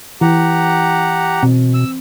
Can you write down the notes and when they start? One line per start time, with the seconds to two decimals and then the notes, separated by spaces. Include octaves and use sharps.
0.21 E3 G4 F#5 A#5
1.43 B2 C4
1.74 E6